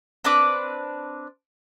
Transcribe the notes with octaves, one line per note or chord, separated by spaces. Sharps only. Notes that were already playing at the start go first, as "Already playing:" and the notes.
C4 D4 B4 D6